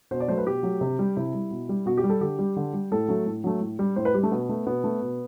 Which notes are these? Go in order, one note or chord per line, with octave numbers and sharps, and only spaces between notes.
B2 C5
D5
F#3 A3 C5
B4
B2 G4
F#3 A3
C3
G3
C3 E4
G3
B2
G3
B2 F#4
G4
G3
A4
D3 G4
G3
D3
G3
A2 A4
F#3 A3
A2
F#3 A3
A2
G3
A2 C5
B4
G3 G4
A3
B2 B3
A3
B2 B3
A3
B2